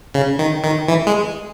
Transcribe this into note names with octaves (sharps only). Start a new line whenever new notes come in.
C#3
D#3
D#3
E3
G#3